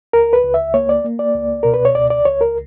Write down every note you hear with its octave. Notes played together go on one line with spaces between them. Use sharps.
C#2 A#4
B4
C#2
E5
A#3 C#5
D5
A#3
D5
C#2
B2 A#4
B4
C#5
C#2 D5
D5
C#2 C#5
A#4